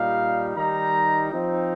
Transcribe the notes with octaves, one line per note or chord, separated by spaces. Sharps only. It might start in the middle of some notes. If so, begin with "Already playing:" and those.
Already playing: A#2 G3 D#4 F5
D#3 G3 D#4 A#5
F3 C4 D#4